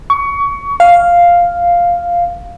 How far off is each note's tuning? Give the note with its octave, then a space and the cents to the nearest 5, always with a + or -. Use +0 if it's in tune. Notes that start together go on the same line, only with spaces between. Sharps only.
C#6 +25
F5 +0